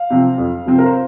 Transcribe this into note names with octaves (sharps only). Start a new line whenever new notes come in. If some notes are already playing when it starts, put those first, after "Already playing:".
Already playing: F5
C3 F3 C4
F2
C3 F3 C4
A#4
C5